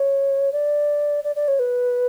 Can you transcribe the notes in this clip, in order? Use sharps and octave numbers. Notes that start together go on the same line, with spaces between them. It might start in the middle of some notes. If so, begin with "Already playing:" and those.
Already playing: C#5
D5
D5
D5
C#5
B4